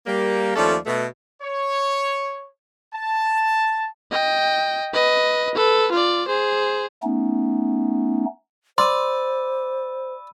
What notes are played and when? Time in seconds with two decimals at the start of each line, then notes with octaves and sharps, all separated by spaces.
0.07 G3 A#3
0.56 D#2 F3 A3 C#4 A4 D5
0.86 B2 A3
1.42 C#5
2.94 A5
4.12 D#5 G5
4.94 B4 D#5
5.55 A4 B4
5.92 F4 D5
6.28 G#4 C5
7.03 A3 B3 C#4 D#4
8.78 C5 D5 B5 C6 E6 D#7